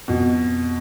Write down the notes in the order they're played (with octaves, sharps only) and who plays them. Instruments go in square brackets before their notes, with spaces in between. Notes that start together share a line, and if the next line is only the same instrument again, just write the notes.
[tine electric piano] F2 [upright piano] B2